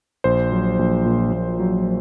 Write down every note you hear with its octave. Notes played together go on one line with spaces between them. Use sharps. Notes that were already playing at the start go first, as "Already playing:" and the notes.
A#1 C5
F#3
A#1
A#2
A#1
F#3